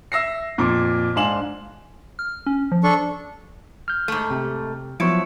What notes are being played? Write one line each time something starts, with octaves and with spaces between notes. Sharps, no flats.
E5 E6 A#6 C7
F2 A#2 D6
G#2 D4 F5 G#5 E7 F#7
F6
C#4
F3
D4 A4 C#6
F6 G6
G#2 A3
C3
F3 F#3 B3 E4 C#6 C#7 D7